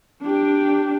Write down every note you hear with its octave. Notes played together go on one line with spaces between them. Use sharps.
D4 G4